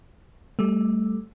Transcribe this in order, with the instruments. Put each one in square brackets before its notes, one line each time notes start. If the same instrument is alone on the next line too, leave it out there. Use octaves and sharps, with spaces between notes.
[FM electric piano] G3 A3